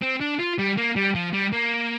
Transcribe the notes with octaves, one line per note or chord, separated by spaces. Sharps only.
C4
D4
F4
G3
A#3
G3
F3
G3
A#3